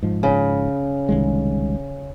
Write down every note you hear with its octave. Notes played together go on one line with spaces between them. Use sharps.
G#2 F3
C#3
C2 D#3 G#3